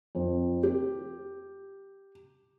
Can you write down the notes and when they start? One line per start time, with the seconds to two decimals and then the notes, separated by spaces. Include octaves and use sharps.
0.15 F2
0.63 G4